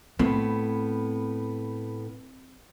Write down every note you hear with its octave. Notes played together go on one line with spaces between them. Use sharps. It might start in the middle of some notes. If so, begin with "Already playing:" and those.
A2 B3 C4